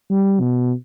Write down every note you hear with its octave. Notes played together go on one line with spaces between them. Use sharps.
G3
B2